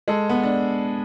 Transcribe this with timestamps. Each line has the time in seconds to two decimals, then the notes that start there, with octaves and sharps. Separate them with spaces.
0.08 G#3 A4
0.29 B3
0.43 D4